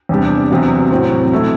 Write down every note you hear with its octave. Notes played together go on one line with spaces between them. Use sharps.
E2 C3 G3 D4 G4
E2 C3 F#3
A2 F#3 C4
B2 A3 E4